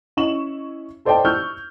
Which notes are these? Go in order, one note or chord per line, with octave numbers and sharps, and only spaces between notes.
C#4 E4 D#5 C#6 E7 F#7
A4 C5 D5 D#5 G5 A5
C#6 E6 F6 G6